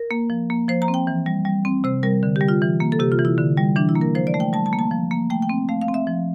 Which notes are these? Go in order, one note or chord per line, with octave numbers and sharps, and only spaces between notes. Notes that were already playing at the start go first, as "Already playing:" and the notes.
Already playing: A#4
A#3
F3
A#3
F3 C5
A#5
C4
G5
E3
G3
G3
C4
C3 C5
G3 A#4
D3
G4
G3
F4
E3
A#3
A4
C3 G4
F4
E3
E4
D3
G3
E3 D4
E4
A#3
A#4
F3 C5
D5
A3
G5
G3 A5
A5
A#3
A5
F3
A#3
A3 G5
G5
C4
A3 F5
F5
C4
E5
F3